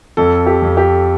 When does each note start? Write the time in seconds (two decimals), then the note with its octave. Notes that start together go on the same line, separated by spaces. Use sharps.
0.17 F2 A4
0.46 G4
0.63 F2
0.77 G4